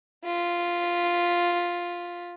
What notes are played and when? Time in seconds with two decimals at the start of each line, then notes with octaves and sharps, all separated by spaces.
0.25 F4 B6